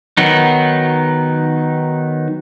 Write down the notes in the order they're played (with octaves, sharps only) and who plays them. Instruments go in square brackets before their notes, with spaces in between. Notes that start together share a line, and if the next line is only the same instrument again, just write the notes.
[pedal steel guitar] D#3 F#3 B3 D#4